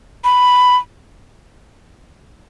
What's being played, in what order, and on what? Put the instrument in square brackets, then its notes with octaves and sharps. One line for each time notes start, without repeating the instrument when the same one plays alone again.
[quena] B5